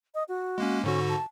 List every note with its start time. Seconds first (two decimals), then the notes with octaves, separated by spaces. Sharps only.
0.14 D#5
0.28 F#4
0.58 G#3 A#3 C#4
0.84 G#2 D3 C#4 F#4
1.09 A5